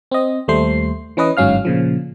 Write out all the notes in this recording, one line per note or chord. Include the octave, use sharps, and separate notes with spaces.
C4 D#5
D#2 G3 A3 C5 C7
E3 C#4 B4 D#5
G1 G#2 F#3 C#4 F5 F6
A#2 C#3 F3